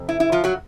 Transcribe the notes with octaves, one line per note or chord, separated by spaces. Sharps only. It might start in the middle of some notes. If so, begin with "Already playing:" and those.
Already playing: F2 C3
E4
E4
F3 F4
F#3 F#4